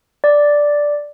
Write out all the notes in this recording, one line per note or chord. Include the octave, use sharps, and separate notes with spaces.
D5